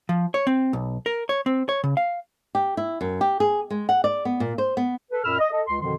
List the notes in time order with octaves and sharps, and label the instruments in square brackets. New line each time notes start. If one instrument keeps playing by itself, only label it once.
[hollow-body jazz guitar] F3
C#5
C4
B1
A#4
C#5
C4
C#5
C#3
F5
[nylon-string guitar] G4
E4
F#2
G4
G#4
G#3
F#5
D5
B3
A#2
C5
B3
[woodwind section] A4 B4
F#2 A#2 B5 E6 F6
D#5
A4 D#5
C#2 C6
F2 B2 D3 D#3 F3 C6